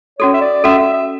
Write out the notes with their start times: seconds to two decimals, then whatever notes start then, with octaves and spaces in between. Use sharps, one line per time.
0.19 C#4 F#4 A4 C#5
0.34 E5
0.41 D5
0.64 C#4 F#4 A4 E5
0.78 E5
0.93 E5